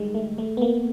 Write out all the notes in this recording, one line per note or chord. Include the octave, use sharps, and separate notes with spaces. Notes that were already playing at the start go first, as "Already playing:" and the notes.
Already playing: D#3 G3 G#3
A3
A3
B3
A#3